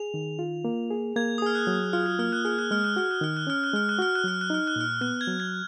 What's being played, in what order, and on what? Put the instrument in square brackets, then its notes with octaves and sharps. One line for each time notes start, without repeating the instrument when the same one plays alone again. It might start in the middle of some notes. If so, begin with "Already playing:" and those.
Already playing: [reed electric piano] G#4 [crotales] F7
[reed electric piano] D#3
F4
A#3
G#4
[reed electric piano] A#3 [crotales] G#6
[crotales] D#6
[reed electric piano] G#4 [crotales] F6
[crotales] F#6
[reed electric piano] F#3
[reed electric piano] F4 [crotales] F6
[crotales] F#6
[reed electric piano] A#3 [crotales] F6
[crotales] F#6
[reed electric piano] G#4 [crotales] F6
[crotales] F#6
[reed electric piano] G#3 [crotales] F6
[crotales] F#6
[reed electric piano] F#4 [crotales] F6
[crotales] F#6
[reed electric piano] D#3 [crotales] F6
[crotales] F#6
[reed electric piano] C#4 [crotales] F6
[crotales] F#6
[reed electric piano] G#3 [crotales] F6
[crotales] F#6
[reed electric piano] F#4 [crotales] F6
[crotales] F#6
[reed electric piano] F#3 [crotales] F6
[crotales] F#6
[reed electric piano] D#4 [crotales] F6
[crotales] F#6
[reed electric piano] A#2 [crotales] F6
[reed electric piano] B3 [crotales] F#6
[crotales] G#6
[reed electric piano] F#3
[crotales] G#6